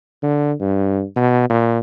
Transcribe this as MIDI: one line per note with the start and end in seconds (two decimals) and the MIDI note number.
0.23 0.53 50
0.60 1.03 43
1.16 1.46 47
1.50 1.79 46